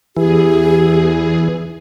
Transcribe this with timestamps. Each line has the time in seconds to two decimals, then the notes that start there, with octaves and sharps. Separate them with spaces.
0.17 E2 E3 G4 G#4